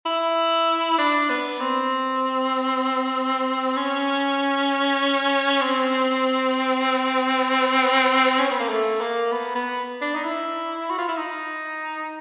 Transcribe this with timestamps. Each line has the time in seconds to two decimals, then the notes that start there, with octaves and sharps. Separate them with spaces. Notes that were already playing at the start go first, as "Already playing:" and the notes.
0.06 E4
0.98 D4
1.30 B3
1.60 C4
3.76 C#4
5.61 C4
8.39 C#4
8.50 B3
8.60 A#3
8.70 A3
9.01 A#3
9.32 B3
9.55 B3
10.01 D4
10.15 D#4
10.24 E4
10.90 F#4
10.98 F4
11.08 E4
11.17 D#4